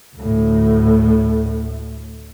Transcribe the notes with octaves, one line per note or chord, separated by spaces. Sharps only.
D2 A2